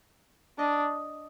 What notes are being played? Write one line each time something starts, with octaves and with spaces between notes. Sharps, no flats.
D4 D#5